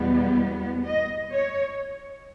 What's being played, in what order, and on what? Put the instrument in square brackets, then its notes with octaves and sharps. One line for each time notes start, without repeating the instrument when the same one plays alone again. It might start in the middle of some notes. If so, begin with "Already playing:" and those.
Already playing: [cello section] E2 B2 G3 B3
D#5
C#5